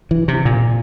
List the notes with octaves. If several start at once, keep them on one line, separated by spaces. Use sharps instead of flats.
E3
C3
A#2